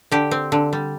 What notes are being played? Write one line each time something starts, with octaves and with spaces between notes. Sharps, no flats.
D3 G4
C4
D3
G3